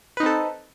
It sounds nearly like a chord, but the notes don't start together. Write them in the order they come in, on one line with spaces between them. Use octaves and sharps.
B4 D#4 C4 A4